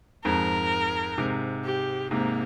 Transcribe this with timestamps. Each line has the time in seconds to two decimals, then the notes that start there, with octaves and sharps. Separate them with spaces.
0.25 F2 G#2 A#4
1.18 G#2 C3
1.64 G4
2.11 G#2 C3 A#3